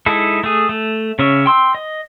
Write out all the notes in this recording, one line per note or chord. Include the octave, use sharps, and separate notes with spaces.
G#3 D#4 E4 A4
A3 G#4
A3
C#3 C#4 E5
G5 C6 E6
D#5